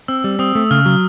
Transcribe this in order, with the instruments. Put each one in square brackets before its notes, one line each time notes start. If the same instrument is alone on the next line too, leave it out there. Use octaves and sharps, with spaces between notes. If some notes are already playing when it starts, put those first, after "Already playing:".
[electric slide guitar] C4 [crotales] E6
[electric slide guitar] G3
[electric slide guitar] C4 [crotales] D#6
[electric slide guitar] A3
[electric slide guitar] C#3 [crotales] F6
[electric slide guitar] F#3